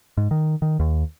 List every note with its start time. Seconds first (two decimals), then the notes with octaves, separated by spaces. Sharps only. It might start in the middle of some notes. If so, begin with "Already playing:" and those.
0.17 G#2
0.31 D#3
0.62 D#3
0.80 D#2